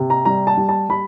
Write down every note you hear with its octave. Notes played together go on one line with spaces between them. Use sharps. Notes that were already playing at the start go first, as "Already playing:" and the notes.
Already playing: C3
A#5
G3 A#5
A5
G3
A5
G3 B5